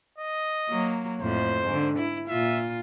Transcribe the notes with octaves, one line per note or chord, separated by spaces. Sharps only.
D#5
F#3 A#3
F2 A2 C5
G#2 D3
E4
A#2 F4 E5